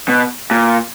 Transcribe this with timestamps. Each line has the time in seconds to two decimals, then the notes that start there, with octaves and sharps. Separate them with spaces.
0.09 B2
0.51 A#2